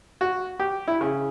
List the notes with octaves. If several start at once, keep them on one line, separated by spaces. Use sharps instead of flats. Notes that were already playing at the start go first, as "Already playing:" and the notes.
F#4
G4
E4
C#3